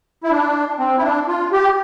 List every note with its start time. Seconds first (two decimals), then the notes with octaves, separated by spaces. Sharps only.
0.24 E4
0.31 D4
0.79 C4
0.98 E4
1.03 D4
1.27 F4
1.52 G4